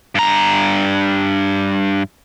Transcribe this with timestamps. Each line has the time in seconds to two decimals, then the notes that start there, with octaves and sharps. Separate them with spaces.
0.15 G2 A#5